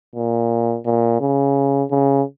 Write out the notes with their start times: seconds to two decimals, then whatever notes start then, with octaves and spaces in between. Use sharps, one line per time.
0.15 A#2
0.85 A#2
1.20 C#3
1.91 C#3